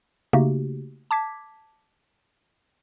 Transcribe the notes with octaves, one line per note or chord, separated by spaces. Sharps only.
C#3 A3 A#3 D#4 F#4 G4
A5 D6 G#6 B6